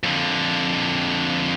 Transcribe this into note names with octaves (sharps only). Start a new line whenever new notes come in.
F2 D3